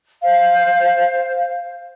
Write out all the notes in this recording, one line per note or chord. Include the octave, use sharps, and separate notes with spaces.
C5 F5